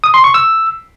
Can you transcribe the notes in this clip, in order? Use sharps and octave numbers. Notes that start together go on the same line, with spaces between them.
D#6
C6
C#6
E6